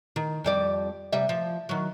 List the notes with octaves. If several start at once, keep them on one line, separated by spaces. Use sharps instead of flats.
D#3
F2 G3 D5
C3 G3 E5
F3
D#3 F#3